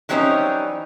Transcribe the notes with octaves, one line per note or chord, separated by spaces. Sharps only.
E3 F#3 G3 C4 C#4 D#4